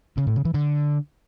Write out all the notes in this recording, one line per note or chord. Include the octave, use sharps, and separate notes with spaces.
C#3
A2
C#3
E3
D3